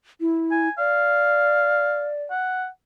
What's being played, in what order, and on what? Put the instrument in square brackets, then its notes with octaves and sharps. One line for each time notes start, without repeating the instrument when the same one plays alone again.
[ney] E4
[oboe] G#5
[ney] D5 [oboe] F5
[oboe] F#5